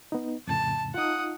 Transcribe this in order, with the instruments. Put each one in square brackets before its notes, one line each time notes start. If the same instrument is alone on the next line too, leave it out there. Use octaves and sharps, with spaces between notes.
[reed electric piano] B3 D#4
[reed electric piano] F2 A2 C#3 [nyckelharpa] A5
[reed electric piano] D#4 F4 [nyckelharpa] F#5 D#6